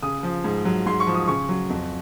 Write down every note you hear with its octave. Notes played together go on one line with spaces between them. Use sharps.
C#3 D#6
F3
G#2
F#3
G#2 C6
C#6
F3
D#6
C#3 C#6
F#3
F2